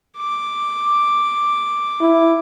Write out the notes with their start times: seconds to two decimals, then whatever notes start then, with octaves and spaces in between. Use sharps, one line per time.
0.17 D6
2.01 E4